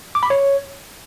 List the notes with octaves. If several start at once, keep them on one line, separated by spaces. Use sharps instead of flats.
D6
B5
C#5